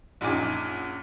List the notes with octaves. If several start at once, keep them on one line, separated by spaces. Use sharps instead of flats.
A#1 F#2 A#2 D#4 G#5 D6